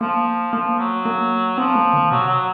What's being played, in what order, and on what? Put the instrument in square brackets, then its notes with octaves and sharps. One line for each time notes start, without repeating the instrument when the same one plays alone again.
[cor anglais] F3 [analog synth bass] A#3
[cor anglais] F3 [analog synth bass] A#3
[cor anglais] F#3
[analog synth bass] A#3
[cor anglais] F3 [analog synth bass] C4
[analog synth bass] A#3
D#3
[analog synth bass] C3 [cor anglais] F#3
[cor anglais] F#3